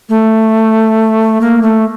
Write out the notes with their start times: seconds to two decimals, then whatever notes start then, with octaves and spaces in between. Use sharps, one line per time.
0.09 A3
1.41 A#3
1.62 A3